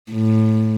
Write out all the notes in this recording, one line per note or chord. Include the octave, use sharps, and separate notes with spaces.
A2